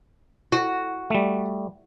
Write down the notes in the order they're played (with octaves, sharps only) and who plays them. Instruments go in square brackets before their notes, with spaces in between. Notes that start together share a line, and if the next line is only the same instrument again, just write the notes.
[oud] F#4
[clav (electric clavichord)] G3 A3